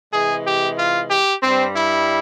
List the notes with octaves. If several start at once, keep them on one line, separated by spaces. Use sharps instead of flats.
C3 E3 G#3 G#4
G4
F4
G4
G2 G3 C4
E4